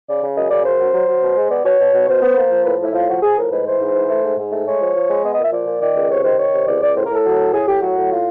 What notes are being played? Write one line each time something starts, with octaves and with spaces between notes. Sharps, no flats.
C#3 D5
C#3
F#2 D#5
C#3 D5
F#2 C5
F#3
F#3
F#3
B2
G#3
B3 D5
B2 C#5
B2
B2
B2 C5
B3
A#3
F3
A2 B4
A2 E4
F3 F4
F3 F#4
F3 G#4
A2 A#4
G#2 B4
E3 C5
G#2
E3
A3
G#2
G#2
A3
G#3 C#5
F3
F3
G#3
B3 D#5
D#5
A#2
E5
F3 D5
A#2
D#3 D5
C#2
C3 C#5
D#3 C5
D#3 C#5
C3
C#2 D5
C#2 D5
A2 C5
A#4
A2 A4
F#3
A2
A2 G#4
A2 G4
F#3 F#4
A2
F4